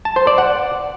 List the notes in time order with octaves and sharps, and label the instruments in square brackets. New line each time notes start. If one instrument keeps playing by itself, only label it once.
[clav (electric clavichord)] A5
C5
D5
F#5